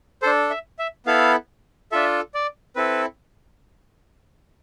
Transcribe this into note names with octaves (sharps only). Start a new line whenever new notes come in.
D4 A4 C5
E5
E5
B3 E4 A4 F5
D4 F4 A4 E5
D5
C4 E4 A4 B4